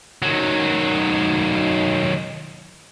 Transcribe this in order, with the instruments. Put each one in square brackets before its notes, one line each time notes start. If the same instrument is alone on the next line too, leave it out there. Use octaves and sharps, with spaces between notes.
[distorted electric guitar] D#3 F#3